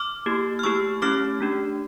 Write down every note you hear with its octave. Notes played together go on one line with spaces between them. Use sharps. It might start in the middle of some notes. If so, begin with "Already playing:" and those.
Already playing: D6 F6
A#3 E4 G4
F6
A3 E4 G4 C#6 E6
A3 C#4 E4 G4 D6 F6
A3 D4 G4